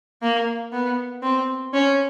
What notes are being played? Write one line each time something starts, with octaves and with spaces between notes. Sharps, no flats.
A#3
B3
C4
C#4